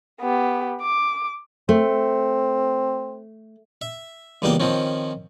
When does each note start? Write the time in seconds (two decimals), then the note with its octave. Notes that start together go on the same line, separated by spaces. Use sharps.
0.21 B3 G4
0.81 D6
1.69 A3 C4
3.81 E5
4.42 C#2 E3 G3 A#3 B3 G5
4.60 D#3 F3 C4 C#4